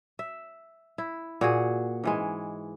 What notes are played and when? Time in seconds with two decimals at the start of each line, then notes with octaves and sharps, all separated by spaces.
0.19 E5
0.98 E4
1.41 A#2 F#4 G#4
2.04 G#2 E3 G#3